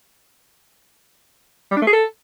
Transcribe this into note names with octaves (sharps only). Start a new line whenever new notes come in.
G3
D4
A3
G#4
A4